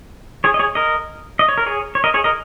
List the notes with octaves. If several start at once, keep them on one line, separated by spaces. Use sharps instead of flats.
G#4 C#5
D#5
G#4 C#5
A#4 D#5
D#5
C#5
A#4
G#4 C#5
C#5
A#4 D#5
G#4 C#5
A#4 D#5